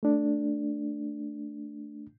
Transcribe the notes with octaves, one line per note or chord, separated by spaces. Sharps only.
A3 D4